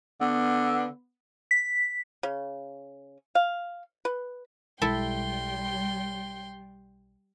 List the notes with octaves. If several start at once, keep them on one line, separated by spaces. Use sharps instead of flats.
D3 B3
B6
C#3
F5
B4
B1 G3 G#3 E4 A4 E5 G5 C6